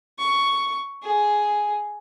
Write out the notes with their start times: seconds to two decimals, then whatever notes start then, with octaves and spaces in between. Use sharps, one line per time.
0.18 C#6
1.03 G#4